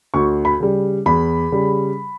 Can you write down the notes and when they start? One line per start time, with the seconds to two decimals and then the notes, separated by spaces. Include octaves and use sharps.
0.14 D2 C#6
0.45 B5
0.60 C#3 G3
1.06 E2 B5
1.52 C#3 G3